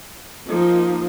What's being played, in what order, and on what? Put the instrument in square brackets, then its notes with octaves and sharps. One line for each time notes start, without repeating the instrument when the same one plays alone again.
[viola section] F3 A#3 D#4